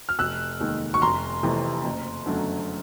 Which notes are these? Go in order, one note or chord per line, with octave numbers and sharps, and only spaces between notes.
F6
F1 E6 F#6
D#2 D#3 G#3
C#6
F1 A#5 C6
F2 C3 E3 A3
F#1
F#2 D3 F#3 A3